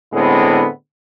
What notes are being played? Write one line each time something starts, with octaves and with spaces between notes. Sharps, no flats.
A2 D3 G#3 B3 C4 E4